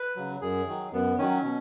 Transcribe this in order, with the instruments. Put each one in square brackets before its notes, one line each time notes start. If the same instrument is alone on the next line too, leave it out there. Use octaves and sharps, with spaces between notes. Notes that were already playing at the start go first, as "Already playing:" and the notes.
Already playing: [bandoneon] B4
C#3 F#3
F#2 G#4
D#3 F#3
F#2 B3
D#3 F#3 C#4
B2